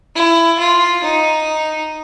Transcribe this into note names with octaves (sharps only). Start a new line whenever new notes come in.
E4
F4
D#4